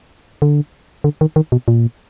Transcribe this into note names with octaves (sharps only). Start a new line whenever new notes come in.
D3
D3
D#3
D#3
B2
A#2